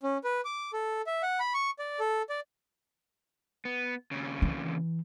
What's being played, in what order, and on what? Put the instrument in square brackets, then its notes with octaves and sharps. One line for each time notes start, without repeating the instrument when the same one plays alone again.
[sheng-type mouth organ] C#4
B4
D6
A4
E5
F#5
B5
C#6
D5
A4
D5
[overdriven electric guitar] B3
D#2 C#3
[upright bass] E3